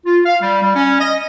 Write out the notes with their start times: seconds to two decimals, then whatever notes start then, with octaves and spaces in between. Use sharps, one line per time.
0.05 F4
0.26 F5
0.42 G3
0.63 G3
0.76 C#4
1.00 D#5